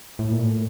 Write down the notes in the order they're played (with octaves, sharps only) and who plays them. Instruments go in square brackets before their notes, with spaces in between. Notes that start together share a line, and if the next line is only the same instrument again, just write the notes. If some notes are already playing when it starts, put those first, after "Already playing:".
[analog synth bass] A2
A#2
A2